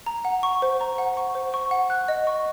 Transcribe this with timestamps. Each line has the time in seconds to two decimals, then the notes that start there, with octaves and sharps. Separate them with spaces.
0.06 A#5
0.25 F#5
0.43 C#6
0.62 C5
0.81 A#5
0.98 F#5
1.17 C#6
1.35 C5
1.54 C#6
1.71 F#5
1.90 F#6
2.08 D#5
2.27 C#6